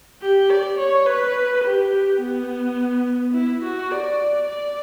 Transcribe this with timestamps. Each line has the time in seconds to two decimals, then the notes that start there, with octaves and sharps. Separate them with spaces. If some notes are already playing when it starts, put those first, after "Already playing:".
0.22 G4
0.50 D5
0.78 C#5
1.06 B4
1.64 G4
2.20 B3
3.33 E4
3.63 F#4
3.91 D5
4.47 D5